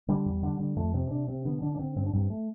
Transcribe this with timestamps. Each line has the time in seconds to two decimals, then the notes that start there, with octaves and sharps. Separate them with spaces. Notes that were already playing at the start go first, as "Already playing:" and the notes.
0.08 D3 G3
0.26 E2
0.43 D3
0.59 D3
0.76 F2 A3
0.94 C3 C4
1.11 C3 D4
1.28 C3 C4
1.45 D3 B3
1.62 D3 D4
1.75 D4
1.79 D3 C4
1.96 G2 C4
2.06 D4
2.13 G2 C4
2.30 A3